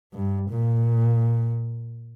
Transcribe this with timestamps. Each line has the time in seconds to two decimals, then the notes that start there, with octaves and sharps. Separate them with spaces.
0.14 G2
0.50 A#2